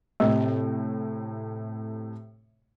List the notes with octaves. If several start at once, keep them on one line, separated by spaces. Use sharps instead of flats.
A2 C3 A3